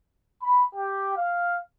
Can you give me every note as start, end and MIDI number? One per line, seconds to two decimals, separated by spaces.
0.41 0.62 83
0.74 1.11 67
1.16 1.58 77